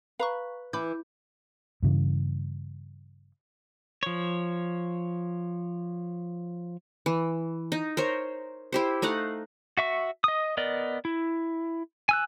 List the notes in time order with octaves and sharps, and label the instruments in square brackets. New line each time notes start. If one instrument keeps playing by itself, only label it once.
[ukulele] B4 [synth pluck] F5 A#5 C#6
[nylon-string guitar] E3 [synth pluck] B5 D6 G6
[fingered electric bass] G2 C#3 E3
[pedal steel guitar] F3 C#5
[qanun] E3
D#4
A#4 C5 C#5
E4 G4 C5
A3 D#4 F5 F#5
[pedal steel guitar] F#4 E5 C#6
D#5 D#6
B3 A#4 D5 D#5
E4
G#5 E6 F#6